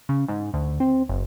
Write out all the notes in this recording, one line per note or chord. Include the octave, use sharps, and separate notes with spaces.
C#3
G#2
D2
C4
F#1